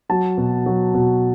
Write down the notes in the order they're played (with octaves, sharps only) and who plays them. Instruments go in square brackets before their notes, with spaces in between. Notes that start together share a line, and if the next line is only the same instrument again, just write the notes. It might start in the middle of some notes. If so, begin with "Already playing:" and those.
[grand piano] F#3 A5
B2
F#3
B2